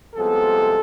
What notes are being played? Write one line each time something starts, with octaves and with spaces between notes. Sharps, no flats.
C2 C3 F3 G#3 B3 A4